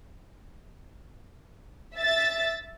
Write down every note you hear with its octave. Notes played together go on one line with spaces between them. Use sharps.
E5 A6